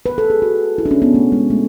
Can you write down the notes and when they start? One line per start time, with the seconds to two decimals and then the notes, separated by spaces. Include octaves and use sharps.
0.06 B4
0.18 A4
0.30 G#4
0.42 F#4
0.78 E4
0.86 D4
0.91 C#4
1.02 B3
1.14 A3
1.32 G#3
1.50 A3